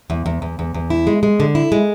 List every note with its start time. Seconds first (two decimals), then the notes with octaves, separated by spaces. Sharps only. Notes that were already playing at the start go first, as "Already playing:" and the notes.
0.10 E2
0.26 E2
0.42 E2
0.59 E2
0.74 E2
0.90 E4
1.07 G#3
1.23 G#3
1.40 D3
1.55 E4
1.72 G#3